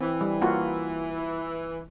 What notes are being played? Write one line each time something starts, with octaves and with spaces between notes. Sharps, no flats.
E3 C4
G3
A#3 F4 F#4